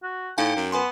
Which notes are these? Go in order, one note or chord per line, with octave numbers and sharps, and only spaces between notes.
F#4
A2 D#4 F5 G5 G#5
F#2
B3 B4 G#5 C6